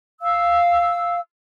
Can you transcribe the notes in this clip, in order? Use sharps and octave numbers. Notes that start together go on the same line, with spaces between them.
F5 E6